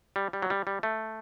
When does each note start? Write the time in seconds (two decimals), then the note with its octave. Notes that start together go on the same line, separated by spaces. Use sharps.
0.16 G3
0.33 G3
0.42 F#3
0.50 G3
0.67 G3
0.83 A3